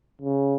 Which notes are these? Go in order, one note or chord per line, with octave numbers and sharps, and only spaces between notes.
C#3